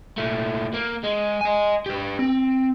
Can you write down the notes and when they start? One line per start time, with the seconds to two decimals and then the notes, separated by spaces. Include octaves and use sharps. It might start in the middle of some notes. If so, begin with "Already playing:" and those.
0.18 A#2 A3
0.73 A#3
1.03 G#3
1.41 D#5 G#5
1.86 G4 B4
2.19 C4